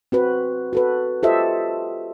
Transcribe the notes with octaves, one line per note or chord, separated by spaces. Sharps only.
C4 F#4 B4
F#4 A4 B4
F4 G4 A4 C5 D#5 E5